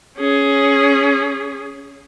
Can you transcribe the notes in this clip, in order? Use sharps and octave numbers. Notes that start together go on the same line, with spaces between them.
C#4 G#4